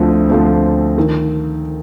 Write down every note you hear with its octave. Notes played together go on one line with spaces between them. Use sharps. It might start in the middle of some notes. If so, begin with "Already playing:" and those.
Already playing: D2 D3 F3 A3 C4
D2 D3 F3 A3 C4
D#3